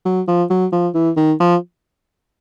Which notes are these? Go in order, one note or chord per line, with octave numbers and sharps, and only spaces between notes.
F#3
F3
F#3
F3
E3
D#3
F3